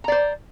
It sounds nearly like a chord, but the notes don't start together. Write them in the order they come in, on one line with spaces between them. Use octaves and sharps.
A#5 D5 C5